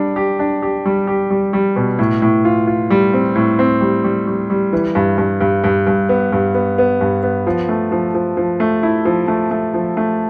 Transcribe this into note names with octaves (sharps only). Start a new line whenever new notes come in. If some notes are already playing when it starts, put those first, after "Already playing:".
Already playing: G3 D4
G4
D4
G4
G3
G4
G3
G3
B2
A2
A2
F4
F4
G3
C4
A2
C4
G3
G3
G3
G3
E3
G2
G2
G2
G2
G2
B3
G2
B3
B3
G2
B3
F3
A3
F3
F3
F3
A3
E4
F3
A3
A3
F3
A3